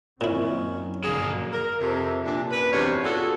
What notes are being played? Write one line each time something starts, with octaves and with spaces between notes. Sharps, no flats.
F#2 A#2 D#3 C4 C#4 E4
A#1 G2 D3 F#3 A#3 G#4
A#4
F2 C3
A#2 D4
F#2 B4
E2 G#2 C3 C#4 D4 C#5
B3 F4 F#4 G#4 A4